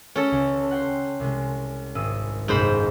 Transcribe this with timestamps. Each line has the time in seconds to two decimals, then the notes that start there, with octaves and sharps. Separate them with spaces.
0.16 C#4 A4
0.32 C#2
0.71 F#5 G5 C6
1.20 C2 G#3
1.95 G#1 D#6 E6
2.48 F#1 B1 G#2 C5 B5